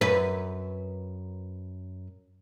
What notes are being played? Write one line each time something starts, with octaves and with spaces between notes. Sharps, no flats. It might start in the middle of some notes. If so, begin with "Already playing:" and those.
F#2 B4